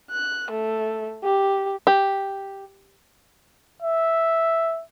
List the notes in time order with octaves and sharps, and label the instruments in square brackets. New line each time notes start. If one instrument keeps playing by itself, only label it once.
[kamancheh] F#6
A3
G4
[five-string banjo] G4
[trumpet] E5